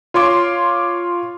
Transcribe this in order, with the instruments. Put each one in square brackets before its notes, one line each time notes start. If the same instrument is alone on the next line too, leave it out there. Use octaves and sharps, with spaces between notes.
[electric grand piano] F4 C#5 C6 D6